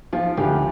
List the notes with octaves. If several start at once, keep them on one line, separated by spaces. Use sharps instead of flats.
F3 F4
D2 G4